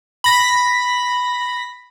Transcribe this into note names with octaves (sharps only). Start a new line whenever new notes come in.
B5 A#6 B6